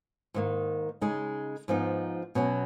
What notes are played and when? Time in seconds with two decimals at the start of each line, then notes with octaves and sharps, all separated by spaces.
0.34 G#2 D#3 A#3
1.01 C#3 G#3 D#4
1.68 G#2 F3 B3 D#4
2.35 B2 F#3 C#4